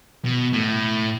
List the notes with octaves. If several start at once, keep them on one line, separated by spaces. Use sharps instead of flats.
B2
A2